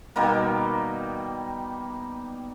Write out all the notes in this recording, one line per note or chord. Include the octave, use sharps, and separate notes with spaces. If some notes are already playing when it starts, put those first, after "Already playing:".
B2 D#3 G3 A#3